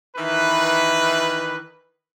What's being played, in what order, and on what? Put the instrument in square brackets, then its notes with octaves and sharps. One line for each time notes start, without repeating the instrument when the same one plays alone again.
[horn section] D#3 E3 B4